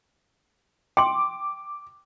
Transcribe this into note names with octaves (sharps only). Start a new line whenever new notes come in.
G5 C6 D6